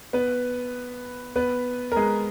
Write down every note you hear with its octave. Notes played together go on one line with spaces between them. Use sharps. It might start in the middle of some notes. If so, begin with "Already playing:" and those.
B3 B4
B3 B4
A#4
G#3 G#4